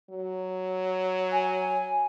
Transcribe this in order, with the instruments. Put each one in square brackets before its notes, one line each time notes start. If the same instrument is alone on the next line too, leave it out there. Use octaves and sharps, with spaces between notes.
[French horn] F#3
[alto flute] G#5